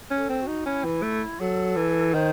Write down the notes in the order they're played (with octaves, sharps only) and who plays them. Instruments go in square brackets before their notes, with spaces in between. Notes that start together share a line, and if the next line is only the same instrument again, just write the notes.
[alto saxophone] C#4
[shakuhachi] A4
[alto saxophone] C4
[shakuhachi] F#4
[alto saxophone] D#4
[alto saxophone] C#4 [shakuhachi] E4
[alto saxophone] E3
A3
[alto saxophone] F#3 [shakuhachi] A4
[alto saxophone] E3
[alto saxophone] D#3 [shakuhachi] C5